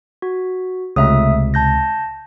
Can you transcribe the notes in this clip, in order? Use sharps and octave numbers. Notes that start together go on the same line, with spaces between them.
F#4
C#2 C3 A3 E5 D#6
A5 G6 A#6